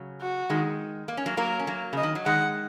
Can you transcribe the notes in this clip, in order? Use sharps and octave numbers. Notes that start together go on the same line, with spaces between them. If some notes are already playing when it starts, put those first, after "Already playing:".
Already playing: C#3 F#3
F#4
D#3 G#3
A#3
C#4
F#3 A#3
F#3 A#3 A#4
C#4
F#3 A#3
C#3 D#5
D#3
F#3
D#3 G#3 F#5